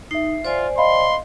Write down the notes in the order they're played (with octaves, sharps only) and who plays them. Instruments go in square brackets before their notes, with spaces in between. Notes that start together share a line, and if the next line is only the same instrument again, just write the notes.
[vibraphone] D#4 [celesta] E5 C7
[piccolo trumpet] F4 [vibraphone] C5 D5 G#5
[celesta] D#5 F5 B5 [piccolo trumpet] C6